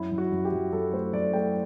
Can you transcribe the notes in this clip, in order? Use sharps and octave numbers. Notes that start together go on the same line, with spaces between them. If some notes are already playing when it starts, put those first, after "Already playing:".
Already playing: F#2 E4
F#2
F#4
F#2
G4
F#2
F#2 A4
A3 C5
F#2 D5
A3 G5